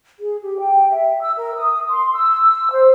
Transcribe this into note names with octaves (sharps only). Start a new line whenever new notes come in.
G#4
G4
G5
E5
E6
A#4
D#6
C6
E6
C5